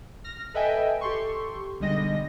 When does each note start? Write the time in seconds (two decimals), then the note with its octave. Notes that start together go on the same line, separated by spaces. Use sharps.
0.24 F6 A#6
0.54 A4 B4 D#5 E5 G5 G#5
1.01 G4 A4 C6 C#6
1.80 B1 D3 G3 G#3 D#5 A#6